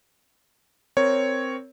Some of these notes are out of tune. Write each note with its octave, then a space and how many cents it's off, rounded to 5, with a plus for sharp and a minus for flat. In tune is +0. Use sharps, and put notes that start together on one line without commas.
C4 +0 A#4 +0 C#5 +0